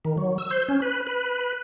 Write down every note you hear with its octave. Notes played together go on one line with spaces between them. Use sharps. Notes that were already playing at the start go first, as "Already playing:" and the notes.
D#3
F#3
E6
C5
C#4
B4
B4